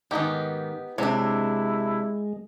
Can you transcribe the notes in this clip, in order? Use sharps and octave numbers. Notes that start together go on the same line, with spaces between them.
G#2 D#3 B3 D#4 G4
C3 G#3 C4 D4 E4 C#5